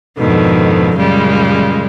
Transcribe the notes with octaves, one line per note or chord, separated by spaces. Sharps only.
F2 G#2 B2 D3 D#3
F#2 A#2 C#3 G3 G#3